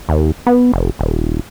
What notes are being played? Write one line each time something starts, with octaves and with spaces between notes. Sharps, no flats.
D#2
B3
F1
D#1